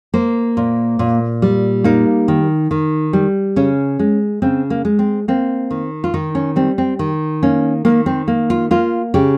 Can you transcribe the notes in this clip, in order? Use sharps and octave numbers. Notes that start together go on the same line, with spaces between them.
A#3 C5
A#2
A#2
G3
A#3 D#4
D#3
D#3
G3
C#3 C#4
G#3
C#3 C4
A#3
G#3
C4
A#3 C4
D#3
F4
D#3 D#4
C#4
G3 C4
C4
D#3
A#3 C#4
D#3 A#3
C4
A#3
F4
A#3 F4
C#3 G4